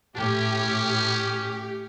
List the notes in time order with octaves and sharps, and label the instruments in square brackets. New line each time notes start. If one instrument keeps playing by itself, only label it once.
[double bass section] A2 [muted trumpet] C#4 [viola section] G4